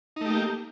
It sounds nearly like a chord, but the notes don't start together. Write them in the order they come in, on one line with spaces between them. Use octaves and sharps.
D#4 A3 G4 A#3